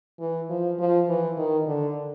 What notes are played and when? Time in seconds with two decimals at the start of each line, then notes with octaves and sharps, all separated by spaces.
0.20 E3
0.50 F3
0.79 F3
1.08 E3
1.38 D#3
1.67 D3